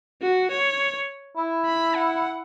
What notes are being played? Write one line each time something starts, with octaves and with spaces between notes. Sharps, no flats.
F#4
C#5
E4
B5
F#5